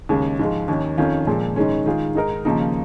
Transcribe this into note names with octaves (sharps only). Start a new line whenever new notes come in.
D#2 C#3 G#3 C#4
G#2 F3 G#3
D#2 D#3 C#4
F2 D#3 C#4 F4
A#2 F3 G#3
G#2 D#3 G#3 C#4
D#3 G#3 F4 G#4
G#2 G#3 D#4 A#4
D#2 C#3 F3 A#3 D#4